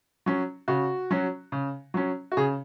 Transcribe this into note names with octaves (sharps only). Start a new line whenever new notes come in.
F#3 C#4
C#3 F#4
F#3 C#4
C#3
F#3 C#4
F#4
C#3 G#4